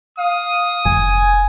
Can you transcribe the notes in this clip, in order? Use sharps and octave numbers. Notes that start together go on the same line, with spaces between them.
F5 D#6
F1 G#5